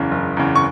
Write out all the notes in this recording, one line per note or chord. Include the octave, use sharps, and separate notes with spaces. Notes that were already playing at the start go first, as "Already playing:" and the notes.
Already playing: F#1 E2 C#3
F#1
E2 C#3
C#6